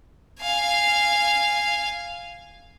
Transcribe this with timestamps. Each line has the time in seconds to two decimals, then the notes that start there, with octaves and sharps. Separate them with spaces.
0.41 F5 G#5